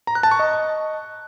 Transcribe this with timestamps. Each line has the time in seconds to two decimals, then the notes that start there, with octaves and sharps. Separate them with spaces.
0.07 A#5
0.15 F#6
0.23 A5
0.31 C#6
0.39 D#5